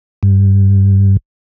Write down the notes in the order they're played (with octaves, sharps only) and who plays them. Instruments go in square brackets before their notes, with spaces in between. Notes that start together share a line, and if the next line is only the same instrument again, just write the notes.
[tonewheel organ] G2